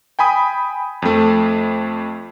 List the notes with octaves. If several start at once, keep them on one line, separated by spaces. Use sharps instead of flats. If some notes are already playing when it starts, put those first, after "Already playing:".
G5 G#5 B5 D#6
F2 A3